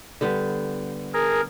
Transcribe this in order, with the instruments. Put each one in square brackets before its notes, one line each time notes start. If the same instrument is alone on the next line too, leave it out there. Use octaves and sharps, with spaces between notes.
[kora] D3 G3 B3
[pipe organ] G#4 A#4